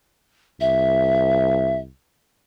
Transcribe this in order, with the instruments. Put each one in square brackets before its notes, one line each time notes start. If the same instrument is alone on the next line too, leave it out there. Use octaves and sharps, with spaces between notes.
[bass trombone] C2 [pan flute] E5